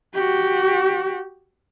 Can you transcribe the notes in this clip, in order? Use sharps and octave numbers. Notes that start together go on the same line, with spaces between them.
F#4 G4